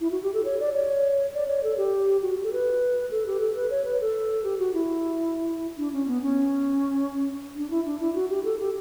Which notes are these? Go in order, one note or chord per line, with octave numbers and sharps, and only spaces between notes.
E4
F#4
G4
A4
C#5
D5
C#5
D5
C#5
A4
G4
F#4
A4
B4
A4
G4
A4
B4
C#5
B4
A4
G4
F#4
E4
D4
C#4
B3
C#4
D4
E4
D4
E4
F#4
G4
A4
G4